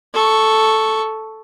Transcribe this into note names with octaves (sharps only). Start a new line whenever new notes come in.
A4 C#6